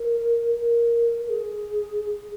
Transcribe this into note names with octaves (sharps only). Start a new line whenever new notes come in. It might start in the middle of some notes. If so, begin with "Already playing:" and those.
Already playing: A#4
A#4
A#4
G#4
G#4